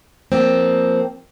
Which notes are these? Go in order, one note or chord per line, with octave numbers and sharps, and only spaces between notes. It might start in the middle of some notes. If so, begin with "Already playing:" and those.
F3 A#3 C4